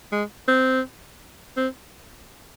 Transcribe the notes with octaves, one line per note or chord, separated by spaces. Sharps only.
G#3
C4
C4